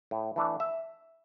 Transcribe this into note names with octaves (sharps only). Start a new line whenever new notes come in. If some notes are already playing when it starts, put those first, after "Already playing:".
A2
E3 A3 D4
E5